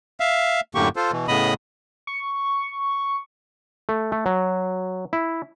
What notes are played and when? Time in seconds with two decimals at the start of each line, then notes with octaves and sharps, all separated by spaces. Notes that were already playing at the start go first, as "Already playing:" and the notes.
0.20 E5 F5
0.75 F#2 A2 D3 A#3 G4 C#6
0.96 F4 A4 C5
1.12 B2 E3
1.28 A2 C#3 B3 D#5 B5 D#6
2.07 C#6
3.89 A3
4.12 A3
4.26 F#3
5.13 E4